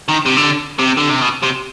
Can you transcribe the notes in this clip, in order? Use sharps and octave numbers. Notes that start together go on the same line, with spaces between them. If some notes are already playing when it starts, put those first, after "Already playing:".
D#3
C3
D3
C3
D3
C3
B2
C3